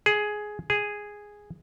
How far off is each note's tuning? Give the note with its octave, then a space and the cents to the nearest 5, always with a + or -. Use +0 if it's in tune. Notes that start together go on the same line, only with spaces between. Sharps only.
G#4 +10
G#4 -5